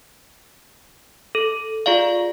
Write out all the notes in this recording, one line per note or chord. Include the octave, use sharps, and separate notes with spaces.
A4
F4 G#4 D5 F5